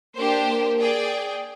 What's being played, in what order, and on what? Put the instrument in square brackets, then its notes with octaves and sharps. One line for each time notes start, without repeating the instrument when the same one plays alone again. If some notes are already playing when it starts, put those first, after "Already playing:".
[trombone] A#3 [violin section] D4 G4 C5
[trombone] A#3
[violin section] G#4 D5 G5